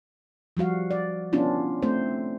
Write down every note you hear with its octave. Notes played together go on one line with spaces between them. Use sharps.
F3 G3 F#4 F5
D5
B3 C#4 D4 E4 F4
A3 C4 C5